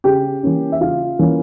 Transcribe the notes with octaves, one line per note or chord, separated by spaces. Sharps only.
C#3 G4 G5
E3 A#3 C#4
E5
C#3 F4 F5
E3 A#3 C#4